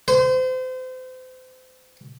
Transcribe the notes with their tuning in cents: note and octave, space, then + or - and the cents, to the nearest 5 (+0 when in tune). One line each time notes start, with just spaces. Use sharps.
C5 -35